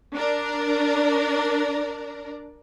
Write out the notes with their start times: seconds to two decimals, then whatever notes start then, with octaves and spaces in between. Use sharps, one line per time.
0.14 D4 A#4 D5